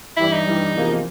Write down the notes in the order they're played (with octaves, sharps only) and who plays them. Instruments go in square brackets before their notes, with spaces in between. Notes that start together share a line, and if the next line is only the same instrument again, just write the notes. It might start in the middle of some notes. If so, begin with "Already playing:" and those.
[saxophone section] G2 E3 G3 [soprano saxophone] E4
[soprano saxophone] D#4
[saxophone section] G2 E3 G3
E2 C3 F3 A#3